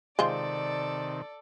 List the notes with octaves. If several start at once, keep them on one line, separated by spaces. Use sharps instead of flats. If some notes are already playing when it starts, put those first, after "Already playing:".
C3 D#3 G#3 C4 F4 A4 D5